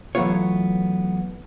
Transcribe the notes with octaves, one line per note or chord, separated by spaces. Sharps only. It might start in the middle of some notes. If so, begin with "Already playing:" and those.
E3 F#3 A3 B3 F4 C#5